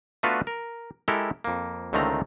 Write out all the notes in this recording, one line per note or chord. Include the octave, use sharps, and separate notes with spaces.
A3 B3 D4 F4 F#4 B4
A#4
G#3 E4 G4 A4 A#4
F2 A#3
C#2 D3 D#3 A3 C4 A#5